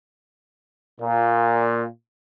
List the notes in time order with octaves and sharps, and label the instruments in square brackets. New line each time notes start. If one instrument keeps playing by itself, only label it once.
[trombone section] A#2